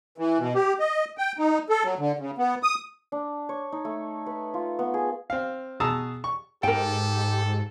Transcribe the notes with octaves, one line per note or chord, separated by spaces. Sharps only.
E3
B2
G4
D#5
G5
D#4
A4
F#3
D3
C#3
B3
D#6
D4
C#5
D#4
A3
B4
F4
B3
G#4
C4 F5
B2 G#4 A5 A#5 D#6 E6
C#6
G#2 G4 A4 A#4 G5